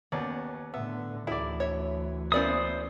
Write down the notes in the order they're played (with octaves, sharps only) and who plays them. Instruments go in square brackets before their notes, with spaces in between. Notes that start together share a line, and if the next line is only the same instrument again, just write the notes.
[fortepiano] D#2 C#4 D5 [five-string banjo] B3
[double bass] A2 D3 [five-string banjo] B3 [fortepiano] E5
[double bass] D2 E3 [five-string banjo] D#4 G#4 [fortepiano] E4 D5
[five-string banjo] C#5 E5
[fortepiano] A#3 B3 E4 [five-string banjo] C#4 D5 E5 [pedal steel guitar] C5 D#6